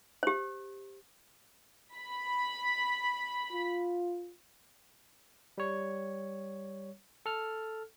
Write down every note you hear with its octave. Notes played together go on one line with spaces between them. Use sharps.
G4 C5
B5
F4
G3 C#5
A4 F6